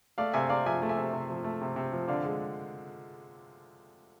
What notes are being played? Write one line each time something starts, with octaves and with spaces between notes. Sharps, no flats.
A3 D5 F5
C3 E5 G#5
C3 D5 F5
F3 E5 G#5
A3
E5 G#5
C3
C3
F3
A3
C3
C3
F3
D3 D5 F5
G#3